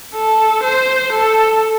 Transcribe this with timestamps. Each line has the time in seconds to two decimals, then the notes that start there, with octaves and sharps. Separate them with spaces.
0.15 A4
0.64 C5
1.13 A4